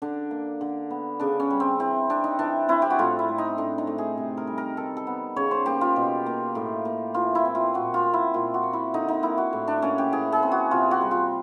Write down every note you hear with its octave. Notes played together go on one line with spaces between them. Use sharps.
D3 D4
A#3
D3
B3
C#3 D4
C#4
G3
C4
E3 C4
C4 D4
D#4
E3 D4
C4 E4
G4
F#4
A2 F4
E4
A3
D#4
A2 D4
D#4
A3
G#4
C3
A#4
G3
A#4
D#3 A4
A4
B3
C#3 C#5
C5
A#3 G4
F4
B2
A#3
A2
A#3
E3 F4
E4
C4
F4
A#2 F#4
F4
C4
E4
A#2 F4
F#4
A#3
E4
D3 D#4
D#4
A#3 E4
F#4
A2
D4
A#3 C#4
G4
E3 G#4
G#4
C4
F#4
C3 F4
F#4
G3
F4